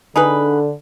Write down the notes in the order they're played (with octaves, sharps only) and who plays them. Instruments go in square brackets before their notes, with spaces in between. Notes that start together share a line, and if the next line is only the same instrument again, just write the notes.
[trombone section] D3 [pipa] D#4 G#4 B4